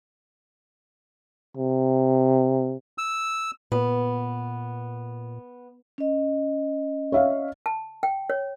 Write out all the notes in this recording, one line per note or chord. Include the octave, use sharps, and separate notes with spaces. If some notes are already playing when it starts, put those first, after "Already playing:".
C3
E6
A#2 B3
C#4 D#5
C#5 E5 F5
A5
G5
C#5